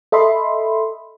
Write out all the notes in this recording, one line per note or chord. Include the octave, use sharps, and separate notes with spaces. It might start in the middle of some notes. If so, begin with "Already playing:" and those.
A4 D#5 E5 B5 C6